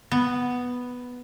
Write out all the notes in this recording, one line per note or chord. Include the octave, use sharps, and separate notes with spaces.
B3